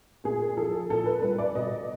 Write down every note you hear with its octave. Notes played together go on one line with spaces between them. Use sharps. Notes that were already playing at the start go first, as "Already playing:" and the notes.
A#2 G#4
F3 A4
A#2 A4
B4
G3 B4
D5
B2 D#5